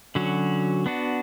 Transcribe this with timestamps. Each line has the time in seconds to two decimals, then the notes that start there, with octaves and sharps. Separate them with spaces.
0.15 D3 F#3 C#4 F#4
0.86 B3 D4 F#4